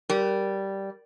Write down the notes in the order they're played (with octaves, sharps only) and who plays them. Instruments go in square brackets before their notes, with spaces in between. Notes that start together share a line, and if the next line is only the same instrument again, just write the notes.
[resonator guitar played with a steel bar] G3 [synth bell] A#4